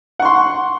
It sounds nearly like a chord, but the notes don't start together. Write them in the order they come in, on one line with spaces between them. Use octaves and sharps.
F#5 C#6 C6